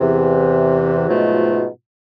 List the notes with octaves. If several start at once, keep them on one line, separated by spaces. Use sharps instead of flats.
E2 C3 E3
G#2 B2 F3 F#3 A3 F4